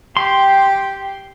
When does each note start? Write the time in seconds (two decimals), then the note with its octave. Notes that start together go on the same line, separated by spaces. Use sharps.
0.17 G4 G5 C6